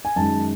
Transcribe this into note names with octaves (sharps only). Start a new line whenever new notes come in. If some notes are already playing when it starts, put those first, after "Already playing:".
G#5
F#2 D#3 G#3 C#4 A5